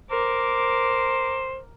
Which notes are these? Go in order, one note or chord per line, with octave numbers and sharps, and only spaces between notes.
A#4 C5 D6